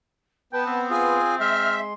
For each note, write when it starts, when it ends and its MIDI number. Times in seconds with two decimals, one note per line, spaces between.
0.53 1.20 59
0.53 0.89 71
0.53 0.66 79
0.53 0.80 81
0.66 1.86 60
0.90 1.35 65
0.90 1.35 68
0.90 1.38 80
1.40 1.94 56
1.40 1.80 76
1.40 1.94 84
1.40 1.74 89